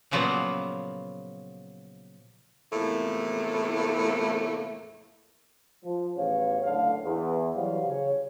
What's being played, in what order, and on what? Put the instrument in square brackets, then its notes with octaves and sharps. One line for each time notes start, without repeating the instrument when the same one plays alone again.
[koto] A#2 C#3 F3 F#3 A#3 B3
[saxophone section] E2 A2 C3 F3 A3 A#3
[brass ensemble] F3
A1 E2 C#3 B4 C#5 F5
F#1 A2 D3 F5
E2
E3 F#3 G3 B4 C5 F5
C#3 C#5